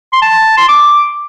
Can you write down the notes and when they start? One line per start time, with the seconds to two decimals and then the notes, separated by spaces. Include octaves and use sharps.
0.13 C6
0.22 A5
0.57 C6
0.68 D6